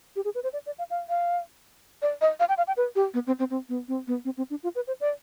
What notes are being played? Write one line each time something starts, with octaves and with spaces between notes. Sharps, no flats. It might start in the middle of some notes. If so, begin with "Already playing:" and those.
G4
G#4
B4
C5
D5
D5
F5
F5
F5
D5
D#5
F5
G5
F5
G5
B4
G4
B3
C4
C4
C4
B3
C4
B3
C4
C4
D4
F4
B4
C5
D5